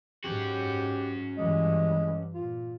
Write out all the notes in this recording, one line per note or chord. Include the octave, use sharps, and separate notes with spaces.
G#2 C#4 F#4 G4
G2 E3 G#3
A#2 F4